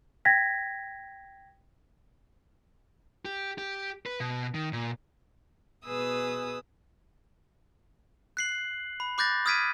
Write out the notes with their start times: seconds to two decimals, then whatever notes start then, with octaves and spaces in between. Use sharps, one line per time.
0.25 G5 G#6 A#6 B6
3.25 G4
3.58 G4
4.06 B4
4.20 B2
4.54 D#3
4.73 A#2
5.85 B2 G#4 B4 D#6 E6
8.37 F#6 C7 F#7
9.00 B5
9.18 B5 D6 F#6 G6 A6 A#6
9.46 D#6 F6 G#6 B6 D7 D#7